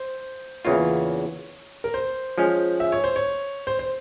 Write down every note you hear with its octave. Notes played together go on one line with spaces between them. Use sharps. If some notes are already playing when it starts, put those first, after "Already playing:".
Already playing: C5
E2 C#3 E3 A#3 F4 C#5
A#4
C5
F3 G#3 C#4
E5
C#5
C5
C#5
C5
C5